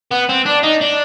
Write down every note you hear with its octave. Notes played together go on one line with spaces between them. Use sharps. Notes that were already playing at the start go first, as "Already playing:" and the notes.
B3
C4
D4
D#4
D4